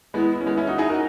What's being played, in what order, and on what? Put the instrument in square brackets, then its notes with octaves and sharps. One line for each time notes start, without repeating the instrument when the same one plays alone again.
[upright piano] G#3 B3 [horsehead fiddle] E4
[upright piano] C#4
G#3 B3
C#4 E4
D#4 F#4
[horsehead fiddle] D#4 [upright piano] E4 G#4
[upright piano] F#4 A#4